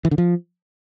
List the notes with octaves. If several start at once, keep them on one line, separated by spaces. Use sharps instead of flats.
E3
D3
F3